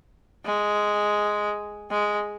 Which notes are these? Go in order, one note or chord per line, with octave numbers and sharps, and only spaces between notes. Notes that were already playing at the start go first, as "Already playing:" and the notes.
G#3
G#3